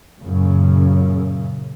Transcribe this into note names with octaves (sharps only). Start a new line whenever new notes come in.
F#2 A#2 C#3